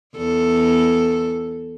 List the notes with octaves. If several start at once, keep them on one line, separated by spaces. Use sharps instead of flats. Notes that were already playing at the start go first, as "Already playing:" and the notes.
E2 A4